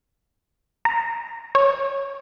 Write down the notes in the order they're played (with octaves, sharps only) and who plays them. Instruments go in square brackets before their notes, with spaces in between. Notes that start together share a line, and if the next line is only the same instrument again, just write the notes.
[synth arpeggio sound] A#5
C#5